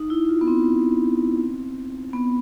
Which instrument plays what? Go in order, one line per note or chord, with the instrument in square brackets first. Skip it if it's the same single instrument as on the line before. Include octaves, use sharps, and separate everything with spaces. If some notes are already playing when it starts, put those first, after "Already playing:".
Already playing: [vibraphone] D#4
E4
F4
B3
C4
B3